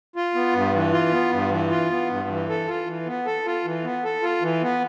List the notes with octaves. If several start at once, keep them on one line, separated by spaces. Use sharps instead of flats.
F4
B3
G2
E3
F4
B3
G2
E3
F4
B3
G2
E3
A4
F4
E3
B3
A4
F4
E3
B3
A4
F4
E3
B3